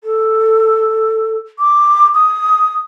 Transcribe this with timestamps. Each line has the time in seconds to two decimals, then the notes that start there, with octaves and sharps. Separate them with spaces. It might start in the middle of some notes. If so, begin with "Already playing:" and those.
0.04 A4
1.59 D6
2.14 D#6